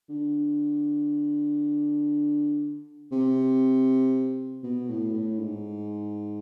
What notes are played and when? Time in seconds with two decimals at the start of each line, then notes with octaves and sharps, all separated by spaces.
0.09 D3
3.12 C3
4.63 B2
4.89 A2
5.13 A2
5.39 G#2